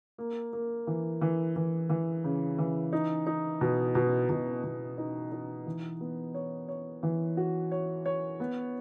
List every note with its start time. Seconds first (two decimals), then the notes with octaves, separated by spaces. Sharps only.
0.18 A#3
0.53 A#3
0.87 E3
1.21 E3
1.56 E3
1.90 E3
2.24 C#3
2.58 E3
2.93 D#4
3.26 D#4
3.61 B2
3.95 B2
4.29 B2
4.64 B2
4.98 D#4
5.32 D#4
5.66 E3
6.01 B3
6.34 C#5
6.69 C#5
7.03 E3
7.37 F#4
7.72 C#5
8.06 C#5
8.40 B3